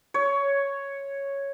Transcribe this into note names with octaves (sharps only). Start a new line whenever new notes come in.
C#5